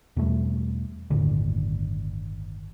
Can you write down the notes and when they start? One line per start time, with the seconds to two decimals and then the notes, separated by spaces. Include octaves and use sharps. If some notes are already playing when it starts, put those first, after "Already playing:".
0.17 E2 B2 G3 A3
1.10 G1 D#2 A2 D3